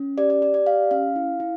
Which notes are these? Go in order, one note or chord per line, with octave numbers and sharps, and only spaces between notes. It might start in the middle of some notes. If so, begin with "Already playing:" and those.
Already playing: C#4
G4 D5
D5
G4 D5
D5
G4 F5
C#4 F5
E4
E4